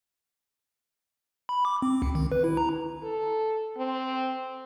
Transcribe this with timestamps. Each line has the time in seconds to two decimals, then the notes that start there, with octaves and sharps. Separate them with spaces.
1.49 B5
1.65 D6
1.82 C4
2.02 C#2
2.15 D#3
2.32 B4
2.44 E4
2.57 A#5
3.03 A4
3.77 C4